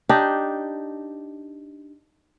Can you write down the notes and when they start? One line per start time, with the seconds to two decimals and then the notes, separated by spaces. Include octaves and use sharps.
0.09 D4 D#4 G4